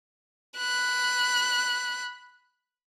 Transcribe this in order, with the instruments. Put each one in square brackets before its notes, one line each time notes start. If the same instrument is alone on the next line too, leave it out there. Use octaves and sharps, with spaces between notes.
[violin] B5 F#6